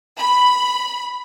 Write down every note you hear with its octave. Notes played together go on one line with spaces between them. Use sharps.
B5